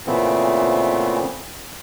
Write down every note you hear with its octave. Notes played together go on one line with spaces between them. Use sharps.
A#2 C#3 E3 A3 B3 C4